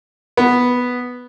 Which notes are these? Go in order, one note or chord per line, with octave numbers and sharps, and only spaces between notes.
B3